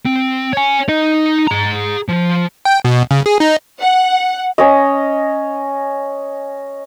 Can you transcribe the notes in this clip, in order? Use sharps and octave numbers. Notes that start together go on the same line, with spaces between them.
C4
C#5 G#5
D#4 D#5
G#4 A#5
F3
G5
B2
C#3
G#4
D#4
F#5
C#4 C#5 D#5